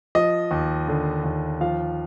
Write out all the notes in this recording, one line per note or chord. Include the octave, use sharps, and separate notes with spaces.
F3 D#5
D#2
D3
D#2
F3 F5